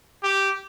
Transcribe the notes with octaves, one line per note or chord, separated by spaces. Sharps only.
G4